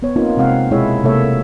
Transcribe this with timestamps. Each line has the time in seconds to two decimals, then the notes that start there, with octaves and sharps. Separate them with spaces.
0.02 B3 C#5
0.16 A#3 C4 D#4 F4
0.37 C3 G#3 C4 F5 F#5
0.71 B2 G#3 E4 G#4 C#5 E5
1.04 C3 A3 A#3 A4 C#5 E5